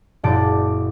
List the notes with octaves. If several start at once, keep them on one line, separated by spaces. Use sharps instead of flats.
F#1 A#2 D5 A5 D7